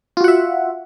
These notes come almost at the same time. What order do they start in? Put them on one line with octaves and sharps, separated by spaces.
F4 F#4 F#5 E5